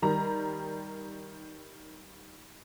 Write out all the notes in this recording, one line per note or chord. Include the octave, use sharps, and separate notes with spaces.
D#3 G3 A#5